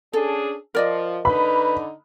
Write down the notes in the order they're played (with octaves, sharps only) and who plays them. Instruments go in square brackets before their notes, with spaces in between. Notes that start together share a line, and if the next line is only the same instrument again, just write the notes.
[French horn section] C#4 D4 G#4 [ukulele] A4
[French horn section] F3 [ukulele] A#4 D5 D#5
[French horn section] D3 D#4 [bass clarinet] B4 [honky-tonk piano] B5